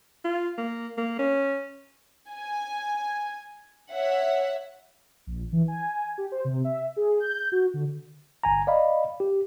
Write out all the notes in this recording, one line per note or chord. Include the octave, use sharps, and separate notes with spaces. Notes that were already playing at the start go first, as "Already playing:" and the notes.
F4
A#3
A#3
C#4
G#5
C#5 E5 F#5
A#1
E3
G#5
G4
C5
C3
E5
G#4
G6
F#4
D3
G1 G#5 A#5
D5 D#5 F5 B5
G4